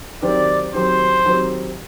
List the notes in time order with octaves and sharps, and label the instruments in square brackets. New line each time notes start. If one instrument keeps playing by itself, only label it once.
[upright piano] D#3 F#3 C4 G4 [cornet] D5
[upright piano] D#3 F#3 C4 G4 [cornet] C5
[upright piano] D#3 F#3 C4 G4